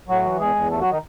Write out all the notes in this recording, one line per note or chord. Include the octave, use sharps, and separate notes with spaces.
A2 F#3 F#4
E3
E2 G#3 G#4
E2
D#2 A3 A4
F#3 F#4
D#3 D#4